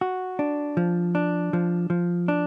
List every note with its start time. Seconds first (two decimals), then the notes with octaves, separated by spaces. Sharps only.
0.01 F#4
0.39 D4
0.77 F3
1.15 D4
1.53 F3
1.90 F3
2.28 D4